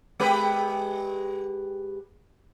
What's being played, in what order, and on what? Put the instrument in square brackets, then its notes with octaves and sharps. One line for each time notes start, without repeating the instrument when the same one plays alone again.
[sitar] G#3 G4 B4